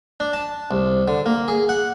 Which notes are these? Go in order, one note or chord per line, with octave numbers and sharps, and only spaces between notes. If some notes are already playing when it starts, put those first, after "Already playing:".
D4
A5
C2
D3
A#3
G#4
F#5